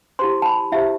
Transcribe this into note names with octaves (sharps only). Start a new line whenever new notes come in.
E4 G4 C5 C6
A5
B5
E4 G4 C5 E5